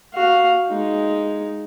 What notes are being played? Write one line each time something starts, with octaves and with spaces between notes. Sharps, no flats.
F#4 F5
G#3 D#4